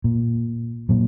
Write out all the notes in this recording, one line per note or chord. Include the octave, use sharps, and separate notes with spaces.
A#2
A#2 F#3